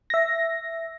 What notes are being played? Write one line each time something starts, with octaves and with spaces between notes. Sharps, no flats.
E5 A#6